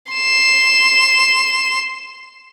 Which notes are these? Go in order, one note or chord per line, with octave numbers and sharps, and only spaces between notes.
C6 E7